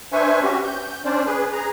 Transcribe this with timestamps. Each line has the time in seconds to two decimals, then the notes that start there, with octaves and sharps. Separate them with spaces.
0.12 D4 B4 C5 E5 G#5 C#6
0.42 C#4 F#4 G4
0.64 G6
1.05 C#4 D4 C5 D5
1.26 G#4 B4
1.52 G#4 A#5